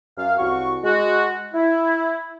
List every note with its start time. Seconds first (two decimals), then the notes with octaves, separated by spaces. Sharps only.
0.17 F#2 F5
0.39 C2 F#4 C#6
0.84 G#3 F#4
1.54 E4